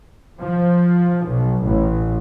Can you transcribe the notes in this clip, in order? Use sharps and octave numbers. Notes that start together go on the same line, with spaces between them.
F3
B1
A1